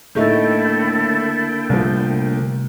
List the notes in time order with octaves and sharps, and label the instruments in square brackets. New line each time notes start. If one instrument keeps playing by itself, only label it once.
[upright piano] A2 A3 D#4 [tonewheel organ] D3 A#3 G5 [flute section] E4 A4
[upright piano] C2 F3 [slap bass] C3 G3 A3